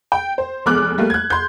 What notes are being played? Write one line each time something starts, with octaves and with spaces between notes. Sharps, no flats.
G5
C5
F1 E2 G#3 D6 F6 F#6
G3 A3 A#3
F#6 G#6
C6 G6